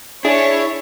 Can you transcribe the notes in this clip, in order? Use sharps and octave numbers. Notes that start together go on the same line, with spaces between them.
D4 E4 G#4 C#5